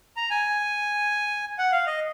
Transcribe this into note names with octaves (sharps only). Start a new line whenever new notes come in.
A#5
G#5
F#5
F5
D#5